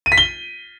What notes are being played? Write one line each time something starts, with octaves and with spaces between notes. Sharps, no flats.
D#7
B6
G7